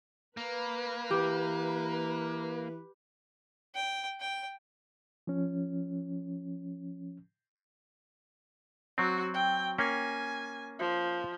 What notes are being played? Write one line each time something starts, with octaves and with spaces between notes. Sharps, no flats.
A#3 B4
E3 G4
G5
G5
F3 C#4
F#3 C4 F#4
G5
A#3 C#4 G#5
F3